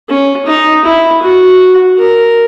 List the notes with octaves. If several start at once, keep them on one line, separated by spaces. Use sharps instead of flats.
C#4
D#4
E4
F#4
A#4